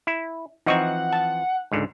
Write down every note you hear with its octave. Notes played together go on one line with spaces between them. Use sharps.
E4
E3 F3 C4 D#4 D#5 F#5 C#6
A5
C#2 G#2 D3